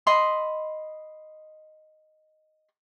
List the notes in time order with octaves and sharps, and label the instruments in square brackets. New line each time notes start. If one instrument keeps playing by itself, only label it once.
[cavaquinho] D#5 B5 C6